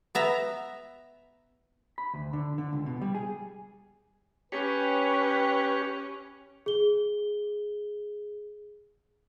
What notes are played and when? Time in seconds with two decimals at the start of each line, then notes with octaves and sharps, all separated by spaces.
0.15 B3 E5 A#5
1.98 B5
2.14 D2
2.33 D3
2.58 D3
2.73 C#2
2.86 B2
3.02 G3
3.15 G#4
4.52 C#4 G4 B4 C#5
6.66 G#4 G7